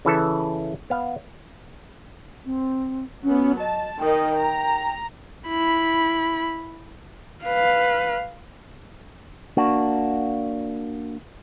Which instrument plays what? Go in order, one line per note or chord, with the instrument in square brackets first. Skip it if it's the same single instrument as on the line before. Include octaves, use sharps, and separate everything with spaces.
[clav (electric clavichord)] C#3 E3 A4
B3 F5
[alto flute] C4
[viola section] F#3 B3 [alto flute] C#4
[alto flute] D#5 [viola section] A5
[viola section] D#3 D#5 [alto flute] G5
[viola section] A#5
[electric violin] E4 B5
[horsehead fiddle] B4 F5
[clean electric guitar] A#3 D4 F#4